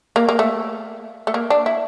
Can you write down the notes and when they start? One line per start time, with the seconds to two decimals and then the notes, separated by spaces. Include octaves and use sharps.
0.16 A#3
0.29 A#3
0.39 A3
1.27 A3
1.34 A#3
1.50 D4
1.66 E4